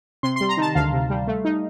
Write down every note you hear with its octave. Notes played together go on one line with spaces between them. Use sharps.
C3 C6
C6
G3
A#5
D#3 A5
D2 F5
C3
G3
A3
D#4